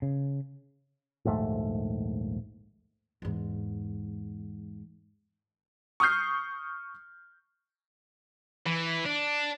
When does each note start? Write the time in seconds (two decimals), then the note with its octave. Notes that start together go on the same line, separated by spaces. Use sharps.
0.02 C#3
1.25 A#1 D#2 G#2 A3
3.22 E2 G#2
6.00 C#6 D#6 F6 G6 C7
8.66 E3
9.06 D4